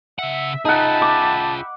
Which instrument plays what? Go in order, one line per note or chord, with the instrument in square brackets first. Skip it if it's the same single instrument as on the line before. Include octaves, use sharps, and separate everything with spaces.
[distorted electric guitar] C#3 F#5 [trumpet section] E5
[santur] D#4 F#5 [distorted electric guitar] F4 G#4 [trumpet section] E5 G5 B5 [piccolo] A5
[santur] D6